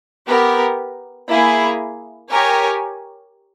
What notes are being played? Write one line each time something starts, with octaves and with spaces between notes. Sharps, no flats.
B3 G4 A#4
A#3 E4 G#4
G4 A#4 C#5 G#5